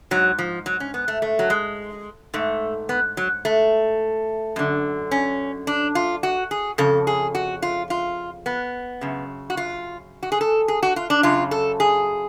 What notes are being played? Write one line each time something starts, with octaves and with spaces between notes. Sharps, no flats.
G#2 F#3
F3
F#3
C#4
B3
A3
A3
F#3
G#3
G#2 A3
B3
F#3
A3
F#2 D3
C#4
D4
F4
F#4
G#4
F2 C#3 A4
G#4
F#4
F4
F4
B3
F#2 C#3
F#4
F4
F#4
G#4
A4
G#4
F#4
F4
D4
F#2 C#3 F4
A4
G#4